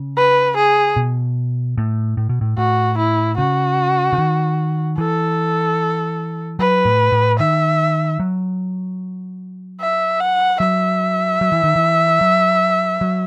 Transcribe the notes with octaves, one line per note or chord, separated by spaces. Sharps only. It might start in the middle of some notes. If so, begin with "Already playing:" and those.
Already playing: C#3
B4
G#4
B2
A2
A2
B2
A2
A2 F#4
E4
C#3 F#4
C#3
D#3
E3 A4
F#3 B4
A2
A2
D#3 E5
F#3
E5
F#5
F#3 E5
F#3
E3
D#3
E3
F#3
F#3